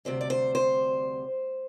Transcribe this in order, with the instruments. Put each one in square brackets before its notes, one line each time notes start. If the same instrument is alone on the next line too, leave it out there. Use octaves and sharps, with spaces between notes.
[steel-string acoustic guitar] D2 C3 G3 C5
D5
C5
C5